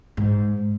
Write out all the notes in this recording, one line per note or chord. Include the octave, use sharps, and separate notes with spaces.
G#2